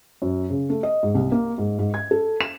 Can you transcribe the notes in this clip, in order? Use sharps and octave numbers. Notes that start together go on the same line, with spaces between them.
F#2
C#3
A3
D#5
G#2
C2
A#3
G#2
G#2
G#6
A4
E7